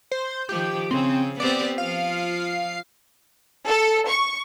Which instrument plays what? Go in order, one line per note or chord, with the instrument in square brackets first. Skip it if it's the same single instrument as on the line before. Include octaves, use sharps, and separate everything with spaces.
[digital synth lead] C5
[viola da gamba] D#3 F3 [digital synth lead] G4
[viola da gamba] C#3 [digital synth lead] C4
[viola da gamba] B3 C4 G4 [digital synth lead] D5
[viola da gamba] F3 F4 [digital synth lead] F5
[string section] A4
C#6